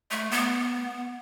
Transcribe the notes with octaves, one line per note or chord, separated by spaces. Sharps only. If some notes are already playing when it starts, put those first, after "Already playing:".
A3
B3